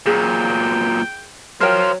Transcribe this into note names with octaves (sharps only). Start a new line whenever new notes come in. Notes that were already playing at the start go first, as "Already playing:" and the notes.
A#2 F#3 G#4 G5
F#3 A#4 C5 F5 G5